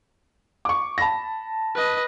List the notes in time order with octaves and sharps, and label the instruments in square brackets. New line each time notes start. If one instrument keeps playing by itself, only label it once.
[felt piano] C#6 D6
A5 B5 A#6
[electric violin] B4 D#5